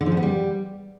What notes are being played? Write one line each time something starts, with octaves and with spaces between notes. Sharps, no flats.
D3
F3
C#3
B3
G3